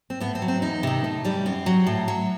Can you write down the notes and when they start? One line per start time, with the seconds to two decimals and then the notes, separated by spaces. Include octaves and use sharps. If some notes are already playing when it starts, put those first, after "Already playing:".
0.10 C4
0.20 A2 B3
0.35 C4
0.42 F#3
0.48 C4
0.62 E2 D#4
0.83 C3 D#3
1.04 A2
1.25 E3 G3
1.46 F#2 C4
1.66 F#3
1.87 A2
2.08 F#3